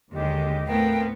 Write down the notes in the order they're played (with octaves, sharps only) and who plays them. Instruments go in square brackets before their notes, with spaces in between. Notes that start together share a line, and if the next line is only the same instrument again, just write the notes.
[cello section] D#2 G#3 [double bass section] D3 [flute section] G4 D#5
[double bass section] A2 A3 C4 [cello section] B3 [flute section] A#4 F5 G5